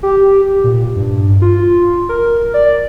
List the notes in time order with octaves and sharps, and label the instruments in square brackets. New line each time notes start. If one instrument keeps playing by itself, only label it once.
[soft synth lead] G4
A#2
G2
F4
A#4
D5